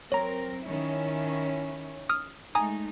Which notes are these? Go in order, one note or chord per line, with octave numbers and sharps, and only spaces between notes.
F#3 C4 A#4 C#5 A#5
D#3 C#4 E4
D#6 F6
G#3 A3 D#4 G#5 A#5 D#6